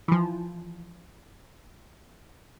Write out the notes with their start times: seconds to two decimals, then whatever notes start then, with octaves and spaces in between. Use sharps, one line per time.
0.08 E3 F3